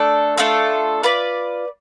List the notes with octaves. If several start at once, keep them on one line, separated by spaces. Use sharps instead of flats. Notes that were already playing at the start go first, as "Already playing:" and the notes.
Already playing: A3 D4 A4
A3 D4 F4 A4
F4 B4 D5